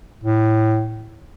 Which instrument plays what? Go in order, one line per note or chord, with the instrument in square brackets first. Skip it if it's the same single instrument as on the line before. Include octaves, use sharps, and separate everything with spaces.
[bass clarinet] A2